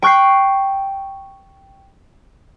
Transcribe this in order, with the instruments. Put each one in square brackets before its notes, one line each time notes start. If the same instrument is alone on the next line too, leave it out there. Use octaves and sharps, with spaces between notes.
[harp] G5 C#6 F#6 G6 C7